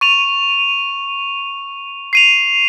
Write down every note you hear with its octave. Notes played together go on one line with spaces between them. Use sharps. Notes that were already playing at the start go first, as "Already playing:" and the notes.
C#6 D#7 F7
C7 D#7 F7